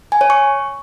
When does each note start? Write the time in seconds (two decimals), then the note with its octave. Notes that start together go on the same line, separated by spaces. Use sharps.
0.12 G#5
0.21 C#5
0.30 C#6